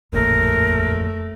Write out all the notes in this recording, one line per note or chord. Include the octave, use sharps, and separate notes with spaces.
D#1 A1 F2 A3 A#3 A#4